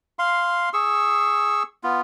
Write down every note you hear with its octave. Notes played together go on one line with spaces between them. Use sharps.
F5 C6
G#4 C#6 E6
B3 F4